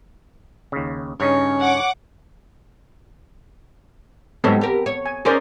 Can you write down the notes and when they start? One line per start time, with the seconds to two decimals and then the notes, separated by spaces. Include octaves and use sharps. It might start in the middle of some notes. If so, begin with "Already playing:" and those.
0.72 D#2 C#3
1.20 G2 C#3 C#4 D#4 C#5
1.60 F#5 D6
4.44 G#2 F#3 G3 B3 C4 A4
4.61 G4 A#4
4.86 C#5
5.06 G#5
5.25 C#4 D#4 G#4 A#4 C5 D5